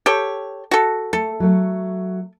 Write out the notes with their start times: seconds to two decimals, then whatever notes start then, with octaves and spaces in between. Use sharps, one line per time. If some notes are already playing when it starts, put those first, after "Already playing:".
0.06 G4 A4 C#5
0.71 F#4 A4
1.13 A3 A4
1.40 F#3 A3